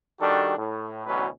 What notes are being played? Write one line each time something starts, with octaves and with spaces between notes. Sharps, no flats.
D#3 G3 D4 F#4 G4 A4
A2
A1 D2 B2 F#3 C#4 B4